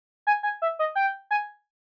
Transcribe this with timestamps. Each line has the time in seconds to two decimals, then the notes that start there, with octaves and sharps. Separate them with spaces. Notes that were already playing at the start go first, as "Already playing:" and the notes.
0.27 G#5
0.43 G#5
0.62 E5
0.79 D#5
0.95 G5
1.31 G#5